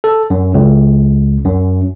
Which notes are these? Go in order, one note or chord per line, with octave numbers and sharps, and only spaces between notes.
A4
F#2
C#2
F#2